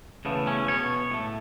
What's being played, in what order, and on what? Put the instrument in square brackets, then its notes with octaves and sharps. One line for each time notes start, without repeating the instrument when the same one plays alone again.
[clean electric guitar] E2 C#3 A3 B3
C#4
B2 B3 C#5
A2 A3